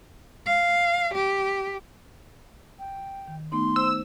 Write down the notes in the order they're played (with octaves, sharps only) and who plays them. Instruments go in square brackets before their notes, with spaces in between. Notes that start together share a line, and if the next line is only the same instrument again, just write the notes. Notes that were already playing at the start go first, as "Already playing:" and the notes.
[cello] F5
G4
[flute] G5
[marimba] D#3
[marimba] A3 B3 D#4 [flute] C6
[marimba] C5 [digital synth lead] E6